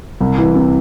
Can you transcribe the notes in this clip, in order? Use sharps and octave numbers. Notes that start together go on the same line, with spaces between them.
C2
E3
C3